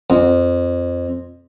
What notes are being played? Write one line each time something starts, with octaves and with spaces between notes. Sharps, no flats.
F2